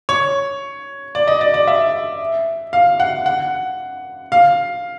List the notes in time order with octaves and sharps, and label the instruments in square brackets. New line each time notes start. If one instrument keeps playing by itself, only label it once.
[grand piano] C#5
D5
D#5
D5
D5
E5
F5
F#5
F#5
F5